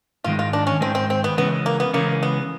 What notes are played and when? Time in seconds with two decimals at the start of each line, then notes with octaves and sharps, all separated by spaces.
0.24 G#2 D#3 G#3 F4
0.39 F4
0.53 D4
0.67 C#4
0.81 G#2 D#3 G#3 C4
0.95 C4
1.10 C4
1.24 B3
1.37 C#3 E3 G#3 B3 C#4
1.66 A#3
1.80 B3
1.93 C#3 E3 G#3 A#3 C#4
2.23 B3